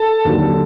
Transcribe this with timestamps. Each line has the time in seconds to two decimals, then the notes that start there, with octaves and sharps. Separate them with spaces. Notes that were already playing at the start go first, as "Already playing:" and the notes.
Already playing: A4 A5
0.25 D#2 D3 F#3